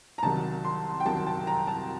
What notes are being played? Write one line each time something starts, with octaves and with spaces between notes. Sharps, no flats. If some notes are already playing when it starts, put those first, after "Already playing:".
A#5
C2 C3 D#3 F#3 A5
C6
G5
C2 C3 D#3 F#3 A5
A5
A#5
A5